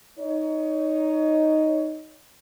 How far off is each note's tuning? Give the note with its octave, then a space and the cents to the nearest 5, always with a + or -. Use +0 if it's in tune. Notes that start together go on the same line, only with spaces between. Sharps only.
D#4 +0 C#5 +25